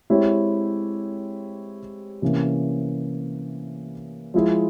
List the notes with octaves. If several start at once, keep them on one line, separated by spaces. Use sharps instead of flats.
G#3 C4 E4 G4 C#5
C3 E3 A#3 C#4
F3 G#3 E4 G#4